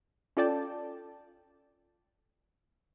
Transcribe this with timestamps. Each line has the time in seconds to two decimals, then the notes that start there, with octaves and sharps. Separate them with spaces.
0.37 C#4 F4 A4 D5 G5 A5